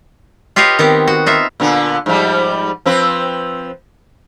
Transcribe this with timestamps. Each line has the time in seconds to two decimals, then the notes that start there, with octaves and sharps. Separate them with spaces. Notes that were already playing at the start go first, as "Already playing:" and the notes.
0.56 F4 G4 B4 C#5 D#5 F5
0.79 D#3 B3 C4 G4
1.07 F#4
1.26 D#4 F4 E5
1.60 A#2 D3 B3
2.06 G#2 F3 G3
2.86 F3 C4 B4